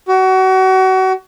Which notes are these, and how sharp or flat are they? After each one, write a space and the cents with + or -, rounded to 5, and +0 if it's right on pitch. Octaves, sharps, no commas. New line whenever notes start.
F#4 +30